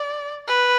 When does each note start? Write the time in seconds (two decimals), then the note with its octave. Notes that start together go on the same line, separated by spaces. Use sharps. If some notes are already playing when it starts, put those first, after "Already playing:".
Already playing: D5
0.48 B4